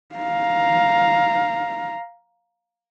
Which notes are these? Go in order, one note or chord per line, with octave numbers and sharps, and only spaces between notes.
F5 A#5